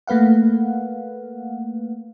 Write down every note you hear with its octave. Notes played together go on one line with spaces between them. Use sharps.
A3 A#3 B4 F5 F#5